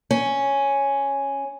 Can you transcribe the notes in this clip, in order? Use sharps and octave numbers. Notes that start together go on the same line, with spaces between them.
C#4